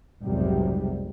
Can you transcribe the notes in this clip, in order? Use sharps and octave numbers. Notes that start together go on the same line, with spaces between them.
F1 B1 G#2 C3 F#3 G3